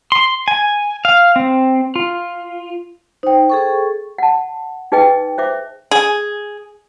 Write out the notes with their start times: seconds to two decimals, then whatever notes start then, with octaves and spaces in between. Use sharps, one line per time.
0.12 C6
0.48 G#5
1.05 F5
1.36 C4
1.96 F4
3.23 D#4 C5 G5
3.50 G#4 A4 C#6
4.18 F#5 A5
4.92 D#4 G#4 B4 D#5 G5
5.38 C5 E5 D6
5.91 G#4